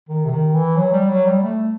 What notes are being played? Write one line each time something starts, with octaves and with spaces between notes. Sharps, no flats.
D#3
C3
D#3
E3
F#3
G3
F#3
G3
A3